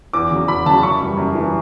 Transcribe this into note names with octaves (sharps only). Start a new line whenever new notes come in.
E2 D6
C#3 F#3
E2 B5
C#3 F#3 A5
F#2 C#6
E3 G3
F#2
E3 G3